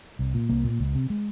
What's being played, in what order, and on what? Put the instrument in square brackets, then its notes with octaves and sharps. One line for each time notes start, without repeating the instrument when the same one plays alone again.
[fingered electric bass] C2
A#2
C2 A#3
A#2
C#2
C3
G#3